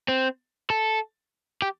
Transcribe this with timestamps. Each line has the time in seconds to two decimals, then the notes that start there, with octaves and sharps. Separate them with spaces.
0.08 C4
0.70 A4
1.62 G4